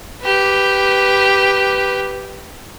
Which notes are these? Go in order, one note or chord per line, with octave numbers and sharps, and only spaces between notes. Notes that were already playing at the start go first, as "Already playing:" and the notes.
G4 B4